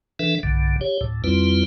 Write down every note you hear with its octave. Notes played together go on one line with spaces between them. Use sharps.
E3 D4 A4 B4 E5
B1 G2 D3
G4 C#5
D2 A2
F2 G3 C4 E4 F4 B4